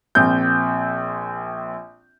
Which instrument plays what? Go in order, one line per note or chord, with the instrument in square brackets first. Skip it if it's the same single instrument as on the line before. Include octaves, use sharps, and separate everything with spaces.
[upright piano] A#1 C4 G6